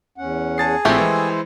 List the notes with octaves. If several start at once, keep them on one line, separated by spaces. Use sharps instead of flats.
E2 C#4 F#5
G#4 A5 A6 C7
A#1 F3 A3 C4 E4 G4 C5
E3 G#3